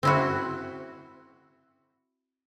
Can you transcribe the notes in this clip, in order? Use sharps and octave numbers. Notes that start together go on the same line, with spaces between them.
C4 E4 F#4